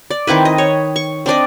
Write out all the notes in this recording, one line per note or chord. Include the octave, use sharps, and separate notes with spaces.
D5
D#3 C4 E4 B4
D#5
C#5
C#6
C4 D4 D5 D#5